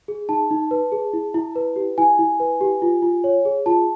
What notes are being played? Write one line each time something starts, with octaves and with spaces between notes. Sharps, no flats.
G#4
D#4 A5
D#4
B4
G#4
E4
E4
B4
G4
E4 G#5
E4
B4
G4
F4
F4
C#5
G#4
F4 A5